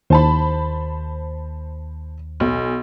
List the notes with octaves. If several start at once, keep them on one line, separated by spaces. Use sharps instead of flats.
D#2 C5 A5 B5
B1